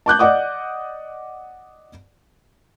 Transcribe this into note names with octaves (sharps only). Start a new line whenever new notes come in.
A5 D6 F#6 G6
D5 D#5 F#5 D6 D#6